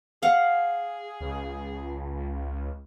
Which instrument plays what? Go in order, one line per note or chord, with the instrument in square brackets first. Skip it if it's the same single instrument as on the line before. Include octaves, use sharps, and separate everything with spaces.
[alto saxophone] G#4 [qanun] F5 F#5
[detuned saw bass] C#2